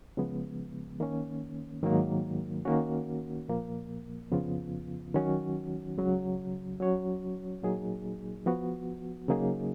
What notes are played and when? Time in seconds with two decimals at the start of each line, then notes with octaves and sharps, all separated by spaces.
0.17 C#3 F3 G#3 B3
1.00 D#3 A#3 C#4
1.83 G#2 D#3 F#3 A#3
2.65 D#3 A#3 C#4 F#4
3.48 A#2 F3 A#3
4.32 F2 C#3 F3 B3 F4
5.14 D#3 F#3 C#4 F#4
5.97 C#2 C#3 F#3
6.80 F#3 C#4 F#4 C#5
7.62 A#2 F#3 A#3 D#4 G#4
8.46 F3 B3 F#4
9.28 C#3 F#3 A#3 D#4 G#4